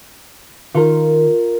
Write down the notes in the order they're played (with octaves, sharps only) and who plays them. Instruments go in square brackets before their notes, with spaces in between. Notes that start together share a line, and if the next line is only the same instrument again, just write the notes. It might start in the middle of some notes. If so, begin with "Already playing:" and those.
[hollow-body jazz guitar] D#3 [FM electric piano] F4 A#4